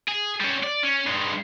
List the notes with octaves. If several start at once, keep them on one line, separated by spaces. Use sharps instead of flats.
G#4
G3 C#4
D5
C#4
G2 G#3